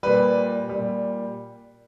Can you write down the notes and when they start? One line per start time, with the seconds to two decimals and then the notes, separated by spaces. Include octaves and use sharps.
0.03 A#2 G3 B4
0.69 A#2 G3